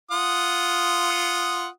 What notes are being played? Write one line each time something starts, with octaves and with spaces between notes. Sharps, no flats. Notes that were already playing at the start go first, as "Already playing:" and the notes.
F4 F#5 D#6